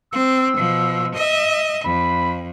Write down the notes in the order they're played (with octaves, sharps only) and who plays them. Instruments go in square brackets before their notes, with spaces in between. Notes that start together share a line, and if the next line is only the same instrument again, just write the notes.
[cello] C4 [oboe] E6
[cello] B2 F3
D#5 E5
[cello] F2 [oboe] B5